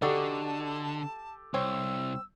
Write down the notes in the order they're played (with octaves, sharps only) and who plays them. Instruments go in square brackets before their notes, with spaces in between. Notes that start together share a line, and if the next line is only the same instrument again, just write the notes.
[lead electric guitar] D3 [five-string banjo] D4 D#4 F#4 [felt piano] G4 A4 [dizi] A5
[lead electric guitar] C2 [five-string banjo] C4 C#5 [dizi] E6